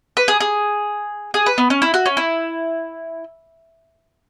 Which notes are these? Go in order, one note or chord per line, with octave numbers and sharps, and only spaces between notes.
B4
G#4
G#4
G#4
B4
B3
C#4
E4
F#4
C#4
E4